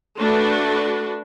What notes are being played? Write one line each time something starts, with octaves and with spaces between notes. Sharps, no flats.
A3 D4 F#4 B4